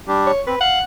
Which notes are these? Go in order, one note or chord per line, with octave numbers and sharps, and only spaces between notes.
G3 D4 G4
C#5
C4 B4
F5 F#5